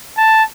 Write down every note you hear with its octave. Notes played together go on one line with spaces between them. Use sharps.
A5